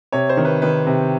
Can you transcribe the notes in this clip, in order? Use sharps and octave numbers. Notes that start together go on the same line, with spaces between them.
C3 C#5
C5
D#3
B4
D#3 B4
C3